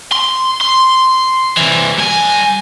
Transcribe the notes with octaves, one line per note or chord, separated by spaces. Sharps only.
C6
C6
C3 E3
G2 G#5